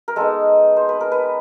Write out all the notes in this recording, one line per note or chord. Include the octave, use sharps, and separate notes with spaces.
A#4
G#3 B3 D#4 A4
C5
B4
A#4
B4